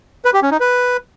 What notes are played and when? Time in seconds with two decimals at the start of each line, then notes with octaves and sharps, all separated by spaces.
0.25 B4
0.34 G4
0.43 C#4
0.51 D#4
0.60 B4